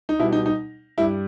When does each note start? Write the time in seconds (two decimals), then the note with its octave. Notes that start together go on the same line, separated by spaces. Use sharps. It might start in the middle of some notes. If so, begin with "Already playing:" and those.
0.09 D#4
0.19 B2 E4
0.22 G3
0.32 D#4
0.46 D#4
0.98 G2 G3 E4